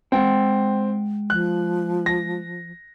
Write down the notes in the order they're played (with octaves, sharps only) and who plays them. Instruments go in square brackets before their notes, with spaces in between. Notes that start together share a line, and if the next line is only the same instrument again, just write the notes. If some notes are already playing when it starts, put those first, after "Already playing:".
[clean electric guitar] G#3 F#5 G5 [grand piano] C4
[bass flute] F3 [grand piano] F#6
[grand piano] A#6